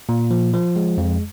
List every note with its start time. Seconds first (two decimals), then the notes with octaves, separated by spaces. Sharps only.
0.09 A#2
0.31 F3
0.53 F3
0.76 G#3
0.98 F2